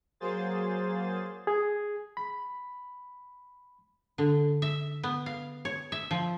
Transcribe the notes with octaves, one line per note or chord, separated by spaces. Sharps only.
F#3 A#3 G#4 C5 A6
G#4
B5
D3
E5
B3
F5
C#5
E5
F3